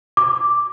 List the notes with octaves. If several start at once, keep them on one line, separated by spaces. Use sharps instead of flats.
D6